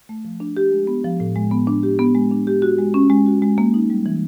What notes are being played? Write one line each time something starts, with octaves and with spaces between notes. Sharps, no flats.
A3
F3
D4
G4
G#3
B3
F3
A2
G#3
B3
D4
G4
B3
G#3
D4
G4
F#4
G#3
C#4
G#3
F#4
G#3
A#3
D#4
G3
E3